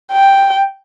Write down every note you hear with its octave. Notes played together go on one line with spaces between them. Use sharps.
G5